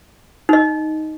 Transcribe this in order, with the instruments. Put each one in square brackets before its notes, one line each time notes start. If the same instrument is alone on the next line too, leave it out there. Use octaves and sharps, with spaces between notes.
[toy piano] D#4 D#5